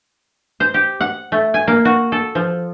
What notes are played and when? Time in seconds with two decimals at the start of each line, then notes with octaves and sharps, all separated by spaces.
0.60 C5
0.74 G4
1.00 F#5
1.32 A3
1.54 G#5
1.67 A#3
1.85 F#4
2.12 A4
2.35 F3